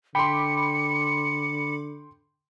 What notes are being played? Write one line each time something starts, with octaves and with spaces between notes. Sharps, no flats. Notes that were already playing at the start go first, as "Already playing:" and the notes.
D3 G5 B5 C6 D6 C#7